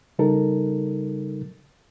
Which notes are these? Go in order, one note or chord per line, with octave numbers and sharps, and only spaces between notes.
C#3 G3 D#4 A4 A#4